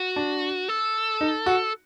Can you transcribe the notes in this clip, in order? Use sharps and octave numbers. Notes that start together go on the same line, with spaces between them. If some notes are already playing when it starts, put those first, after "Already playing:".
Already playing: F#4
D4
A4
D#4
F#4